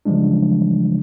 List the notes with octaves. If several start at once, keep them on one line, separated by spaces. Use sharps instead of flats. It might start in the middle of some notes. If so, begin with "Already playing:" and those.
C#3 E3 F3 G3 G#3 D4